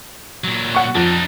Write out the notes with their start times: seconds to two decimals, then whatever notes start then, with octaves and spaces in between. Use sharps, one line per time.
0.44 A#2 F#3
0.75 F#5 C#6
0.95 F2 D4 D#4